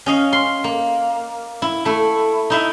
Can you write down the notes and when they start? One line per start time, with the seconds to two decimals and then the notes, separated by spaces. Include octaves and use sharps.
0.06 C#4 D#5 F5
0.33 C6
0.64 A#3
1.62 E4
1.85 A3 E4
2.50 D#4 E4 E5